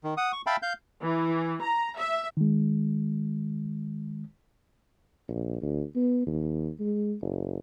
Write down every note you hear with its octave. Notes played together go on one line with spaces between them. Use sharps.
D#3
F#5 D#6
C#6
E5 F5 G5 A5 B5
F5 G6
E3
A#5
E5
D#3 G#3
A#1
D2
B3
D#2
G#3
F#1